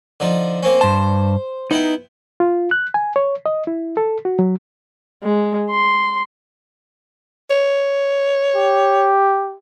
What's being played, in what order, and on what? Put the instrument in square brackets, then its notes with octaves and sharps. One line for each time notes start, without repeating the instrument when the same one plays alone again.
[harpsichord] D3 F3 D#4
A#3 C4 C#4
[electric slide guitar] G2 A5 [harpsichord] C5
[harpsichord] B3 E4 G5 [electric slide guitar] D#4
[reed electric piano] F4
F#6
G#5
C#5
D#5
E4
A4
F#4
F#3
[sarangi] G#3
C6
[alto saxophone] C#5
[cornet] G4